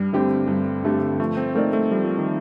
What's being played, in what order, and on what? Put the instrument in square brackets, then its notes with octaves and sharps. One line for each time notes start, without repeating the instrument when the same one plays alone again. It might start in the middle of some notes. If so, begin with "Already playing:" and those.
Already playing: [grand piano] G2 [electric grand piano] G3
[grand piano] D3 A3 C4 G4
G2
D3 A3 C4 G4
[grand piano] F3 [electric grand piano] A3
[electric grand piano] C4
[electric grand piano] A3 [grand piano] A#3 D#4 A#4 D5
[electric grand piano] A3
[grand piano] F3 [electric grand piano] G3
[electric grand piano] F3
D#3